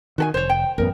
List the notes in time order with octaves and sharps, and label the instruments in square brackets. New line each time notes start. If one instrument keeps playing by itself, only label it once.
[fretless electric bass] D#3 [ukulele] F#4 A4 G#5
[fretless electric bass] F1 [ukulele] C5 C#5
[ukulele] G5
[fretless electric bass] A1 F#2 B3 [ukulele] A#4